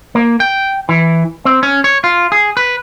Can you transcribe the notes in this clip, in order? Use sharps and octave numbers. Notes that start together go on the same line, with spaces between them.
A#3
G5
E3
C4
C#4
C#5
F4
G#4
B4